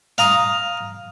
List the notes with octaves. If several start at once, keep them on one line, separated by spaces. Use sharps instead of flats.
F5 A#5 D#6